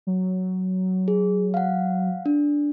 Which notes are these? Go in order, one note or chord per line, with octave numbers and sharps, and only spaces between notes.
F#3
G#4
F5 F#5
D4